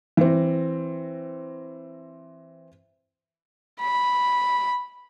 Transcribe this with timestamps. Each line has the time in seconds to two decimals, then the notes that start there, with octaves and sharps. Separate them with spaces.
0.17 E3 C4
3.80 B5